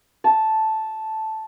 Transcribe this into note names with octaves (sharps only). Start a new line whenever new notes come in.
A5